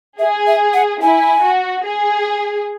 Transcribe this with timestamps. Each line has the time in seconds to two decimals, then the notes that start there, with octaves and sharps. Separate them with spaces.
0.19 G#4 E5
0.47 E5
0.74 F#5
1.01 E4 G#5
1.42 F#4
1.84 G#4